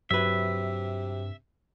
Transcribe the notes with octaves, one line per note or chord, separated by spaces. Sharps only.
G2 C3 F#3 B4 E5